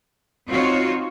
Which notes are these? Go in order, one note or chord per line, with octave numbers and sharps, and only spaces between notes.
C4 D#4 F4 F#4 C#5